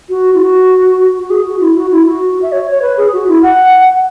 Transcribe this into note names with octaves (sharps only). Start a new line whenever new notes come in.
F#4
E4
F#4
F#4
G#4
F#4
E4
F#4
E4
F#4
E5
C#5
C#5
B4
G#4
F#4
E4
F#5